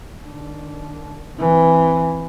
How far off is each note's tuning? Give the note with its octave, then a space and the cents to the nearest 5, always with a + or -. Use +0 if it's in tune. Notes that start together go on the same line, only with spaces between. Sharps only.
D#3 -35 D4 -20
E3 +0 C4 +0